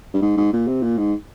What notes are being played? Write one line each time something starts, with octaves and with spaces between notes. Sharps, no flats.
G2
G#2
G#2
A#2
C3
A#2
G#2